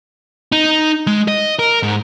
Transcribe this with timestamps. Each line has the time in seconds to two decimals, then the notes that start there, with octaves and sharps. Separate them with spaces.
0.52 D#4
1.07 G#3
1.28 D#5
1.59 A#4
1.83 G#2